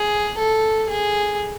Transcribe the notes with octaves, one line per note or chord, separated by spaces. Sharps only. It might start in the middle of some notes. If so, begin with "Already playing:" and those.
Already playing: G#4
A4
G#4